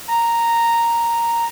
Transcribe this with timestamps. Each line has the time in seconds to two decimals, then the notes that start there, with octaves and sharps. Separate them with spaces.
0.08 A#5